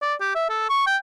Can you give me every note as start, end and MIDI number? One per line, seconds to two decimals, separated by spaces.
0.02 0.14 74
0.21 0.34 67
0.35 0.46 76
0.49 0.69 69
0.70 0.83 85
0.87 0.97 79